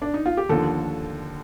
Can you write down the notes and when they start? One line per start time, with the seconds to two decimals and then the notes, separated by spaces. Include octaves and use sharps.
0.02 D4
0.14 D#4
0.26 F4
0.37 G4
0.49 D#2 D3 F3 A4